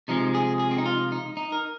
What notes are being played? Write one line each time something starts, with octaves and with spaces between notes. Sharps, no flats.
C3 F3 G#3 D#4
G#4
G#4
C4
D#4
F4
D#4
D#4
A#4